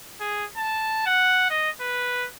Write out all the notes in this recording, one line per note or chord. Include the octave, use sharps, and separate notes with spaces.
G#4
A5
F#5
D#5
B4